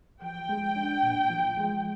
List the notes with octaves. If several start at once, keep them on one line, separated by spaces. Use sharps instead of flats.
F3 G5
G#3
D4
A#2
F3
G#3